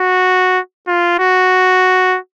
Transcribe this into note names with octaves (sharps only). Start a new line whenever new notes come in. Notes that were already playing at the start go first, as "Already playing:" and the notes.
Already playing: F#4
F4
F#4